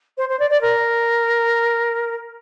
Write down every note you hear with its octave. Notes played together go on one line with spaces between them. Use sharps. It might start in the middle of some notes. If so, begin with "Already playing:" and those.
C5
C5
D5
D5
A#4